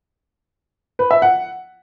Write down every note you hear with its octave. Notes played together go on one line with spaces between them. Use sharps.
B4
E5
F#5